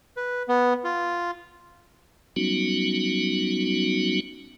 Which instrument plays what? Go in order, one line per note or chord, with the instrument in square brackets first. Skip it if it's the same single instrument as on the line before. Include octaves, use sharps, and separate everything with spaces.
[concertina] B4
B3
F4
[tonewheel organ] F#3 G3 B3 C#4 D#4 F#4